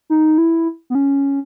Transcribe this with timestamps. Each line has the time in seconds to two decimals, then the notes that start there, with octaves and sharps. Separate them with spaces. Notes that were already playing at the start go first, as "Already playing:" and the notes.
0.10 D#4
0.38 E4
0.90 B3
0.95 C#4